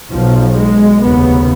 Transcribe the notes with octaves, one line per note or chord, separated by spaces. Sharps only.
B1 B2 F3
G#3
F1 D#2 C#3 B3